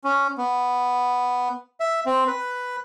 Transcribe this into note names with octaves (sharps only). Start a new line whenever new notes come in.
C#4
B3
E5
C4
B4